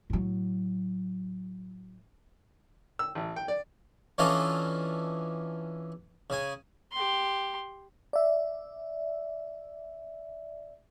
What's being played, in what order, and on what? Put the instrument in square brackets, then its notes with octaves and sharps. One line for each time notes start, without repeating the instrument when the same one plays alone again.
[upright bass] A2 F#3
[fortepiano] E6
A1
G5
D5
[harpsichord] E3 C#4 D4 F4 A4 D#5
C#3 G#5
[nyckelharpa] G4 C6
[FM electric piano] D5 E5